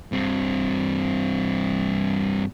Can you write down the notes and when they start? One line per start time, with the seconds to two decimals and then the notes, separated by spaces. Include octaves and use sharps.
0.12 G2 C4